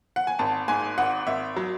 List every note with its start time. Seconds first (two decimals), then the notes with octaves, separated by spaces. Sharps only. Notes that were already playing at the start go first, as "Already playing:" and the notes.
0.16 F#5
0.27 G#5
0.39 G#1 A5
0.68 G#2 G#5
0.98 G#1 F#5
1.27 G#1 E5
1.56 F#3